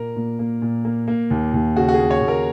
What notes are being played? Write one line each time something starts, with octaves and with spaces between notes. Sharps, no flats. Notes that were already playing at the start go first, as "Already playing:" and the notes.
Already playing: A#2 A#3 A#4
A#2
A#3
A#2
A#3
A#3
D#2
D#2
C#3 F#4
F#4
G#4
A#3
C#5
D#2
A#4